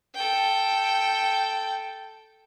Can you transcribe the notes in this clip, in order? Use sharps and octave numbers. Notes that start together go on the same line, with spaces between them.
A4 G5